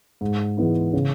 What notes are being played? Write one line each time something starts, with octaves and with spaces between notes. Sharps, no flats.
G#2
E3 G#3 B3 E4
C#3